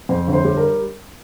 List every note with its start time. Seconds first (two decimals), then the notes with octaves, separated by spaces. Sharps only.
0.09 F2 C5
0.28 G1
0.33 C5
0.44 G3
0.57 A#4